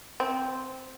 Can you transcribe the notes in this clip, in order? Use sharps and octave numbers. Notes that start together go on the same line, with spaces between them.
C4